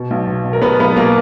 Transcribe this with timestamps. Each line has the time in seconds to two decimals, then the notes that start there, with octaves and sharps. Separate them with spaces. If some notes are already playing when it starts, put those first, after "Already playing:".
Already playing: B2
0.11 B1
0.27 B2
0.44 B2
0.53 A#4
0.62 B2 B3 B4
0.79 B1 B3 B4
0.96 B2 A#3 A#4